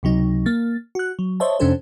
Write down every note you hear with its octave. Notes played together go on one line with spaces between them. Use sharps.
C#2 C3 F#3 D#4
A#3 A6
F#4 F#6
F#3
C5 C#5 D#5 E5 A5
F2 C3 C#4 D4 A4 C5